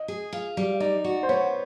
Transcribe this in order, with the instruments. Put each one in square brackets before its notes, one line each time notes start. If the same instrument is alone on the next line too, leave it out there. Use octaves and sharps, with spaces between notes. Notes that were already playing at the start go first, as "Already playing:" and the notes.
Already playing: [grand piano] D#5
[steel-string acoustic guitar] G#4
F4
G3
[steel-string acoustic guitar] D#4 [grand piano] D5
[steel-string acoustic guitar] F#4
[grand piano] C5
[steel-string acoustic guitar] B3 [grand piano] C#5